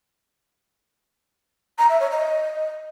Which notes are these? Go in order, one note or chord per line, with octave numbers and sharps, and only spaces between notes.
A#5
E5
C#5
D#5